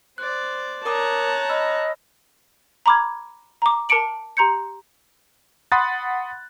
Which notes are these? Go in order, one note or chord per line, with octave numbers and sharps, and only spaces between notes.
C5 D5 F#6
A#4 C#5 A5 A#5 D6 D#6 F#6
D#5 B5 E6 F6
A#5 B5 D6 F6 G#6
A#5 D6
A#4 A5 D6 C#7 D7 F#7
G4 A#5 C6 G6 C#7
F#5 B5 C6 D#6 F#6 A6